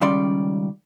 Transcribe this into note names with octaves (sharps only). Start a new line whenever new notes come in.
C#2 D#3 G3 C#4 D5 C6